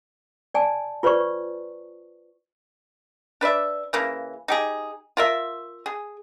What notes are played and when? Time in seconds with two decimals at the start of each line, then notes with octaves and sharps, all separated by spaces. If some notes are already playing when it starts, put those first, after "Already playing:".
0.54 D5 G#5 A5
1.03 F4 B4 C5 D5 C#6
3.41 D4 B4 D5 E5
3.93 C#3 E3 A#3
4.48 D#4 G4 G#4
5.17 F4 A#4 E5
5.86 G#4